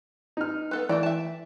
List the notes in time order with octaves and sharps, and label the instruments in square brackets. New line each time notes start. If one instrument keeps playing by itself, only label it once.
[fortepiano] D#4 F6
[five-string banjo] B3 A4 B4
[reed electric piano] E3 [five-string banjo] A3 A4 A#5 [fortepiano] D5
[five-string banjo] E5 A5